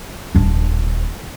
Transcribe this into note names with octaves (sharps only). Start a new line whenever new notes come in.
D#1 D4